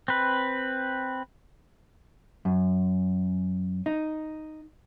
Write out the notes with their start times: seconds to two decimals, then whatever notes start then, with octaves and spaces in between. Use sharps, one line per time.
0.08 C4 B4
2.45 F#2
3.86 D#4